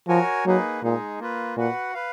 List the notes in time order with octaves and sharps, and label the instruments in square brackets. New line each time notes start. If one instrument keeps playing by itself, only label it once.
[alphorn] F3 [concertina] F#4 A#4 C#5 G#5
[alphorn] F#3 [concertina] A#3 D#4 G#4 B4
[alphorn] A#2 [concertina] G#3 D#4 G#4
[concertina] A#3 F4 B4
[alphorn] A#2 [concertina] F#4 B4 F#5
[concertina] B4 F5